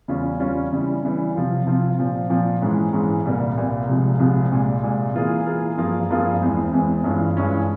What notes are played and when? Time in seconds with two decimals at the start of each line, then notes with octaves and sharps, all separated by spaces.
0.08 E2 C#3 G3 C#4 F4
0.40 E2 C#3 G3 C#4 F4
0.72 C#3 E3 G3
1.03 C#3 E3 G3
1.35 C3 F3 C4 F4
1.67 C3 F3 C4 F4
1.99 A#2 F3 C4
2.30 A#2 F3 C4
2.61 G#2 E3 G#3 C#4
2.93 G#2 E3 G#3 C#4
3.25 C2 A#2 G3 A#3
3.57 C2 A#2 G3 A#3
3.89 C2 C3 F3 G#3
4.19 C2 C3 F3 G#3
4.52 C2 A#2 G#3
4.83 C2 A#2 G#3
5.15 E3 A#3 F4 G#4
5.46 E3 A#3 F4 G#4
5.78 G2 F3 A#3 F4 G#4
6.10 G2 F3 A#3 F4 G#4
6.41 E2 E3 G#3 C4
6.72 E2 E3 G#3 C4
7.04 G2 E3 G#3 C#4 F4
7.36 G2 E3 G#3 C#4 F4